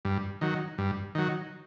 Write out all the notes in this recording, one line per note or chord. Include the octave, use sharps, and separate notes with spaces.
G2
D#3 F#3
G2
D#3 F#3